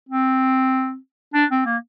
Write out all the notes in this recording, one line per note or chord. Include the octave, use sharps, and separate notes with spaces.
C4
D4
C4
A#3